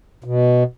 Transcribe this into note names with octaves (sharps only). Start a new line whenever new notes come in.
B2